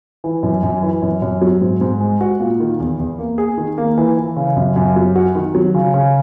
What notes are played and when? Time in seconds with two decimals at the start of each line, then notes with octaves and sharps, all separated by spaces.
0.24 E3
0.43 F#2
0.63 F#2
0.83 E3
1.02 F#2
1.22 F#2
1.42 F#3
1.61 G#2
1.81 G#2
2.01 G#3
2.21 F#4
2.40 A#2
2.60 D#3
2.80 E2
3.00 E2
3.19 A#3
3.38 G#4
3.58 D#3
3.78 A#3
3.98 E3
4.17 E3
4.36 C#3
4.56 F#2
4.76 F#2
4.96 F#3
5.15 F#4
5.35 D#3
5.55 F#3
5.74 C#3
5.94 C#3